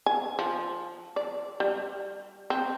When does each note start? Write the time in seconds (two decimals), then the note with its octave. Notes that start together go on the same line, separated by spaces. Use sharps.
0.06 G#5
0.39 F3
1.16 D5
1.60 G3
2.50 C4